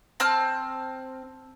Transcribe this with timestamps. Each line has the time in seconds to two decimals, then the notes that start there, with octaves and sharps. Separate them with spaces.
0.20 C4 A5 F6